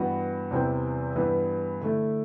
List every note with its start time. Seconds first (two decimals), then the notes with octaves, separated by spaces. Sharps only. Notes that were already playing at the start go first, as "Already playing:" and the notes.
Already playing: G2 E3 B3 F#4
0.51 E2 C3 E3 G3 C4
1.16 G2 E3 G3 B3
1.81 D3 A3 E4